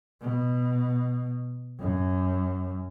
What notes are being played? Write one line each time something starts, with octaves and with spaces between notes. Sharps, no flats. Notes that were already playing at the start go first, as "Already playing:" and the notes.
B2
F#2